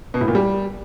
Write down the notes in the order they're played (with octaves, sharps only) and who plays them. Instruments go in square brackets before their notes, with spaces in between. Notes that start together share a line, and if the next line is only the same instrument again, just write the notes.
[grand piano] B2
A2
A#2
G3